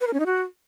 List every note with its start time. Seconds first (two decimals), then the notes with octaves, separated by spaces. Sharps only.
0.01 B4
0.07 A#4
0.13 C#4
0.20 D#4
0.26 F#4